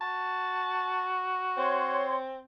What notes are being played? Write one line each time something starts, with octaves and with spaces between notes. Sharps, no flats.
F#4 A5
C4 C#5 C6